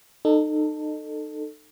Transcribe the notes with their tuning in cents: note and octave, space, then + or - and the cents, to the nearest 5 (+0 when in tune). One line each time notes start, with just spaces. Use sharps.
D#4 -30 A4 +10